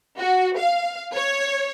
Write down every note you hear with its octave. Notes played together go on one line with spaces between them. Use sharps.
F#4
F5
C#5